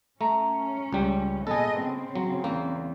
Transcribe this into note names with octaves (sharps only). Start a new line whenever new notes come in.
A3 C#4 A#5
C#2 G3
A#2 B3 G#4 A4 D#5
C#3 C4
F#3
E2 A#3